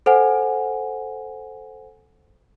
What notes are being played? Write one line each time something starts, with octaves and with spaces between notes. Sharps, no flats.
A4 C5 F#5 G#5